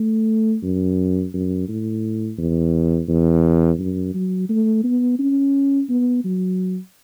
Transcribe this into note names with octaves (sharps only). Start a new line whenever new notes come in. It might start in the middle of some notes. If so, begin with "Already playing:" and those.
Already playing: A3
F#2
F#2
A2
E2
E2
F#2
F#3
A3
B3
C#4
B3
F#3